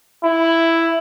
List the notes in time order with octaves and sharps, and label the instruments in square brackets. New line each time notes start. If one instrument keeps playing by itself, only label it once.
[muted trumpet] E4